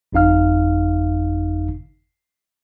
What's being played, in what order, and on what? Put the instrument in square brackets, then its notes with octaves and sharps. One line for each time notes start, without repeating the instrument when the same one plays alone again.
[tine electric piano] G1 F2 D#4 F5 F6